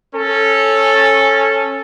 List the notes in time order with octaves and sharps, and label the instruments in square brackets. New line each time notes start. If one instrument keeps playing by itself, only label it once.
[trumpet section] C#4 A4